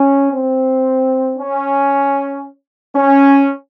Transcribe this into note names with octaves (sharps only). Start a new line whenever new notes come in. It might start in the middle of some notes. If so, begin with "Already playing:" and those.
Already playing: C#4
C4
C#4
C#4